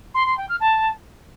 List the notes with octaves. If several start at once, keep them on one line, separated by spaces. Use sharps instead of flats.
C6
C6
G5
F6
A5